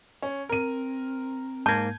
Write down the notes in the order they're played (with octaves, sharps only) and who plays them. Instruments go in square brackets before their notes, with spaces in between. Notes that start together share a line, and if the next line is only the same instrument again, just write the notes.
[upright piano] C#4
[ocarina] C4 [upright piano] A#4 D#7
[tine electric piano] G#2 A#3 [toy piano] A5 [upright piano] G6 G#6